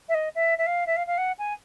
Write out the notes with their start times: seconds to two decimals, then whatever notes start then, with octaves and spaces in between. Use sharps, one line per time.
0.08 E5
0.14 D#5
0.35 E5
0.58 E5
0.66 F5
0.86 E5
0.96 F5
1.06 F5
1.17 F#5
1.38 G#5